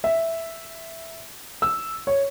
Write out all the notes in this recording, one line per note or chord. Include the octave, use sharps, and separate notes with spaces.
E5
E6
C#5